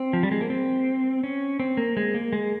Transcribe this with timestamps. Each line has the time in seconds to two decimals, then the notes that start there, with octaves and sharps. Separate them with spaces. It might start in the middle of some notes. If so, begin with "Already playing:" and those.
Already playing: C4
0.13 F3
0.23 G3
0.31 G#3
0.41 A#3
0.50 C4
1.24 C#4
1.60 C4
1.77 A#3
1.97 G#3
2.14 A#3
2.33 G#3